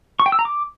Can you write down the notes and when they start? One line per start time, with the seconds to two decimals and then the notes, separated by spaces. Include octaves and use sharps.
0.20 C#6
0.26 G5
0.32 E6
0.39 A#5
0.45 D6